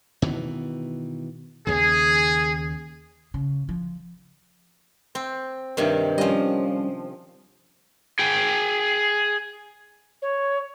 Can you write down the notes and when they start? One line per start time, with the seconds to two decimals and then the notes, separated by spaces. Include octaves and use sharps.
0.22 B2 D#3 E3
1.67 D#2 C#3 G#4
3.34 C#3
3.69 F3
5.15 C4
5.77 G2 C3 D#3
6.18 F3 G3 C#4 D#5
8.19 G#4 G5
10.22 C#5